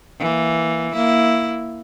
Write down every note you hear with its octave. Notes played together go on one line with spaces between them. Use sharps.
E3 A#3
A#3 E4